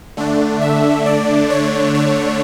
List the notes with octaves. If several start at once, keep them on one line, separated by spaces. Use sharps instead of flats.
D3 A3 D4
E5
D5
C#5
C#5